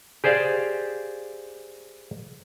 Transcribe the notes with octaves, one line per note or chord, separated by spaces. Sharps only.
G4 G#4 C5 D5 F5